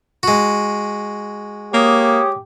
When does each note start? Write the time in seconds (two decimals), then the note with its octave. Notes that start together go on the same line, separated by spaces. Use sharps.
0.23 G#3 F#4
1.74 A#3 G4 C#5 D#6